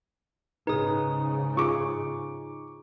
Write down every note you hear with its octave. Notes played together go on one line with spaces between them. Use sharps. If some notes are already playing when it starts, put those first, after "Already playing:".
G#2 C#3 D#4 G#4 B4 D#6
F4 G#4 C#6 D6